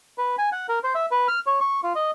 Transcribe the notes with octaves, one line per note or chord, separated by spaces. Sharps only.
B4
G#5
F#5
A#4
C5
E5
B4
F6
C#5
C#6
F4
D#5